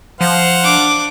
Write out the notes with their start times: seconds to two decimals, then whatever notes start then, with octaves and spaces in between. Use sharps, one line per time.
0.21 F3 C5 F5 F#5
0.63 D4 D6